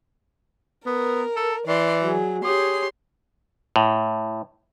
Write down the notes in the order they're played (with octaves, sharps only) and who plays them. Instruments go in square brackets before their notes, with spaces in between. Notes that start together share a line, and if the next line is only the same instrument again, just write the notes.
[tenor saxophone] B3 [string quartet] A#4
[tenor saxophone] A4
[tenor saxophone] E3 [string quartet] D5 C6
[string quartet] F#3 G#4
[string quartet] G4 C#5 C6 [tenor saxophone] G#4
[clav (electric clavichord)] A2